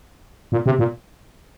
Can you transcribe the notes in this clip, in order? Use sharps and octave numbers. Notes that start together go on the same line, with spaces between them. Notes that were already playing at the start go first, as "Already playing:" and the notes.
A#2
C3
A#2